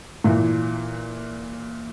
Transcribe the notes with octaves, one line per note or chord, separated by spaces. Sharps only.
A#2 E3